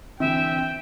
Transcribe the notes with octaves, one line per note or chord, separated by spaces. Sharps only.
D3 E3 C4 E5 G5